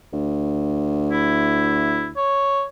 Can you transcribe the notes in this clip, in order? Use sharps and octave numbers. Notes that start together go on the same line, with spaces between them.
D2
E4
C#5